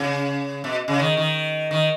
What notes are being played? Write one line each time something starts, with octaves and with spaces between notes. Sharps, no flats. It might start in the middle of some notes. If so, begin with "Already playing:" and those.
Already playing: C#3
B2
C#3
D#3
D#3
D#3